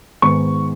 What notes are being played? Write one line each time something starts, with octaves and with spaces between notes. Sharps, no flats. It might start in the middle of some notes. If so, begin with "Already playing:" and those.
G#2 D#3 B3 C#6